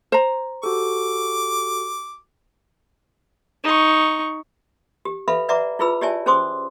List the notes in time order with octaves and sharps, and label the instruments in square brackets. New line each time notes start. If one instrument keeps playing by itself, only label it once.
[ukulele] C5 A#5
[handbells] F#4 G4 A4 [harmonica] D6
[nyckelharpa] D#4 C#6
[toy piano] G4
A4 B4 E5 F5 B5
B4 D5 E5 F#5 A#5 D6
E4 F4 G#4 B4 B5 E6
G4 C#5 D5 E5 G#5 A5
C#4 G#4 C5 C6 D6 D#6